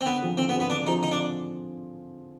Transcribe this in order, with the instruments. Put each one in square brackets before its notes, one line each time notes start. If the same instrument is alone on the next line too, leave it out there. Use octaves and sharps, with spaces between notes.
[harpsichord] C4
[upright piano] D3 [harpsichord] B3
[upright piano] F3 C4 F4 G#4
[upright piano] D3 [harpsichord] C4
[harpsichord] B3
[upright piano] F3 C4 F4 G#4
[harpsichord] B3
[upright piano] D3 [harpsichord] D4
[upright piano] F3 C4 F4 G#4 [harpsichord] D#4
[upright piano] D3 [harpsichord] D#4
[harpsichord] D4